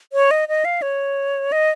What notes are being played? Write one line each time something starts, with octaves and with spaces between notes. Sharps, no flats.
C#5
D#5
D#5
F5
C#5
D#5